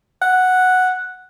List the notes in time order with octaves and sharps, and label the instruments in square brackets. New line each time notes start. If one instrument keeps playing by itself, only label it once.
[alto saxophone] F#5